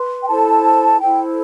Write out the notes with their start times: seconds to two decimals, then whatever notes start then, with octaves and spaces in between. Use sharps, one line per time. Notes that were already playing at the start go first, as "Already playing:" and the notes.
Already playing: B4 C6
0.22 G5
0.28 E4 A4 C5 A5
1.00 E4 A4 C5 G5